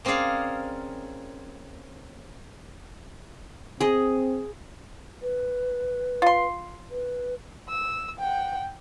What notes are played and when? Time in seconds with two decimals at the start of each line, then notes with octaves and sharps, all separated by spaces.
0.05 A#3 C4 C#4 G#4 D5 F5
3.80 C4 G#4 D#5
5.22 B4
6.22 F4 C6
6.90 B4
7.69 E6
8.19 F#5 G5